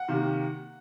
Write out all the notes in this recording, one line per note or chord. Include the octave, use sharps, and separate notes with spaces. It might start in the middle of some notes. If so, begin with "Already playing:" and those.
Already playing: F#5
C3 D#3 A#3